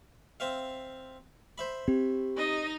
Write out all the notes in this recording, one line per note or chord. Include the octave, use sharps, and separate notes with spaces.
C4 E5 F5
C5 E5 B5
C4 G4
D#4 D#5